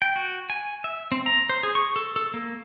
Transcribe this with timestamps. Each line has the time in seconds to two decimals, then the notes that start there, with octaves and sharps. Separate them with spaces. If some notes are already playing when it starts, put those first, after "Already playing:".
0.02 G5
0.16 F#4
0.50 G#5
0.84 E5
1.12 C4
1.26 A#5
1.49 C5
1.63 G#4
1.75 C#6
1.96 A4
2.16 A4
2.34 A#3